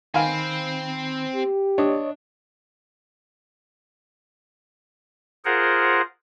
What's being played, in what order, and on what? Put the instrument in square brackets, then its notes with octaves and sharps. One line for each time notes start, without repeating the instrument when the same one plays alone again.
[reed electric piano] D#3 B5 [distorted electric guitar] C4 C5 [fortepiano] F5 G#5
[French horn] G4
[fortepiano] D4 [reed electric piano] C#5 D#5
[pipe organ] F4 G#4 A#4 C5 F#5